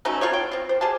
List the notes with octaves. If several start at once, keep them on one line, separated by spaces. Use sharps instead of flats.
F#3 A3 C#4 D#4
C4 F4 A4 C#5
G5
C4 F4
C5
G4 G#4 F5 A5